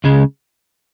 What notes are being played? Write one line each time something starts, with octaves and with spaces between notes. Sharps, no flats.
C#2 C#3 G#3